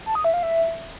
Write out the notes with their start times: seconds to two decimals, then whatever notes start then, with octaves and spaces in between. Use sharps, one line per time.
0.06 A5
0.15 D#6
0.24 E5
0.34 F5
0.43 E5